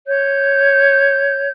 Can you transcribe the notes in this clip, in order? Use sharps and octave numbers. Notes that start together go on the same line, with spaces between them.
C#5 G6